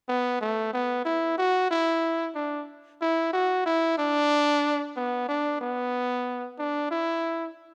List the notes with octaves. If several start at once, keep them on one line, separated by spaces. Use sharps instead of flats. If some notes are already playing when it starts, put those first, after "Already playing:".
B3
A3
B3
E4
F#4
E4
D4
E4
F#4
E4
D4
B3
D4
B3
D4
E4